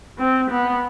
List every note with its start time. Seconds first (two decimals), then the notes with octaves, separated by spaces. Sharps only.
0.18 C4
0.51 B3